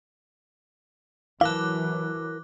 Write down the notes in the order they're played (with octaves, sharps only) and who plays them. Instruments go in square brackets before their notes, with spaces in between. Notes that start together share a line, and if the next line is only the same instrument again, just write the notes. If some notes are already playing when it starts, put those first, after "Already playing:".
[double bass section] E3 F#3 [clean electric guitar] E4 A#4 A5 [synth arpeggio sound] F5 [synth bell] D6 F#6